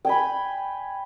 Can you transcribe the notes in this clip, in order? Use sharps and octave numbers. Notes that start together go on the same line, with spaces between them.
G5 G#5 B5